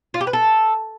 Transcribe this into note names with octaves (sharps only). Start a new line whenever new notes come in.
F4
G4
B4
A4